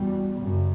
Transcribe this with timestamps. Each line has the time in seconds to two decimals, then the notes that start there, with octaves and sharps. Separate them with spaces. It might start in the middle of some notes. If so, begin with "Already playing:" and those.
Already playing: E2 B2 G3
0.40 F#2 C#3